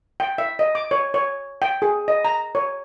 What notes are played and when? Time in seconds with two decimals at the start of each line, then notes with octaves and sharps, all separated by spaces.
0.20 G5
0.38 E5
0.59 D#5
0.75 D6
0.91 C#5
1.14 C#5
1.62 G5
1.82 G#4
2.08 D#5
2.25 A#5
2.55 C#5